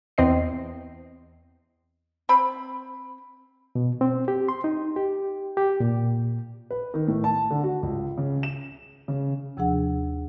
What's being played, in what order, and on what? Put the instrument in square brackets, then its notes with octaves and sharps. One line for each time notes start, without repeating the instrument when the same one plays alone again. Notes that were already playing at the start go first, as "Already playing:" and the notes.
[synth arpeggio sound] E2 C4 D#5 C7
[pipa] C4 B5
[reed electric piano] B2
C4
G4
C6
D#4
G4
G4
A#2
[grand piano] B4
D#3
A2
A5
D3
F#4
C#2
C#3
E7
C#3
[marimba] D#2 C3 F3 D4 G#4 F#5